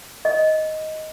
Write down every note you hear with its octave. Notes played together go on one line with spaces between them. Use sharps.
D#5